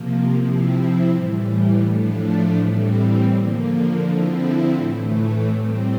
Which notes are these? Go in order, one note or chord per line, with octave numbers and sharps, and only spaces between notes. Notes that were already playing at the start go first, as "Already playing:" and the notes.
Already playing: C3 F3 A#3
C3 F3 C4 E4
A2 E3 G3
A2 F3 A3 D4
A2 E3 G3 C4
D3 F3 A#3
D3 F3 C4 E4
A2 E3 A3
A2 G3 C4